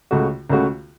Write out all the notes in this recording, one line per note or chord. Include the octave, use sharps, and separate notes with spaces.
C#2 C#3 A3 F#4
C#2 C#3 A3 F#4